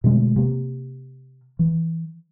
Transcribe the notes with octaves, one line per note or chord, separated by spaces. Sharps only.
B2 D3 G#3 A3
C3 A#3
E3